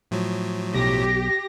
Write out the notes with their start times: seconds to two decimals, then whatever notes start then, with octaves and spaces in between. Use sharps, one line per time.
0.11 A2 F3 F#3
0.74 B1 G4 A#6